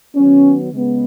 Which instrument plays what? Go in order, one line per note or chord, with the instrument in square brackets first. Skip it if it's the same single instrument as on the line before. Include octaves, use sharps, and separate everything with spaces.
[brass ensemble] D#3 F#3 B3 C#4
C#3 G#3 B3